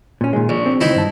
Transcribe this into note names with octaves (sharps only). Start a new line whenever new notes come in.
A#2 C#4
A#2 D#3 G#3
A#1 D4
C4 D4
C#2 D#3 C4 D#4 E4
G2 A5